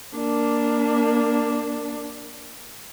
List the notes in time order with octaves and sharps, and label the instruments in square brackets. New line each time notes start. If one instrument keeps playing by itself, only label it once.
[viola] A#3 D4